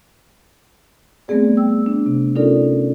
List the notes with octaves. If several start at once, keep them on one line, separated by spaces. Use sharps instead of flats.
G3 A3 B3 C4 G#4 D5
G5 E6
D4
C3
C#4 D#4 F4 A4 A#4 D5